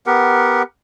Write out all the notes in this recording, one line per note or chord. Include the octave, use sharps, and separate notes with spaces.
B3 G4 A#4 F#5